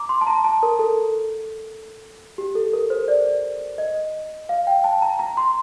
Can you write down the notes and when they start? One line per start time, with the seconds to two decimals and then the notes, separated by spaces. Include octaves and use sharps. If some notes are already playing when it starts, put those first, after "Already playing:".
Already playing: A#5 D6
0.09 C6
0.21 A5
0.27 A#5
0.44 A5
0.63 A#4
0.79 A4
2.38 G4
2.55 A4
2.73 A#4
2.90 C5
3.08 D5
3.78 D#5
4.49 F5
4.67 G5
4.84 A5
5.02 A#5
5.19 A#5
5.37 C6